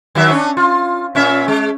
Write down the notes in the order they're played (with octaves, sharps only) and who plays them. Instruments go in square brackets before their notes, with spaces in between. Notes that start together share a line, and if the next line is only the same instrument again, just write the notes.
[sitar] D#3 F#3 E5
C#4 D4
F4
A#2 C#4 E5
G#3